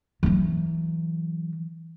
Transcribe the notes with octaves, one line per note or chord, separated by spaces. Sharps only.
E3 F#3